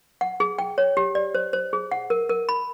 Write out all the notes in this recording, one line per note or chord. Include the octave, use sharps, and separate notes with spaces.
F#5
G#4
G5
C#5
G4
D5
C5
C5
G#4
F#5
A#4
A#4
B5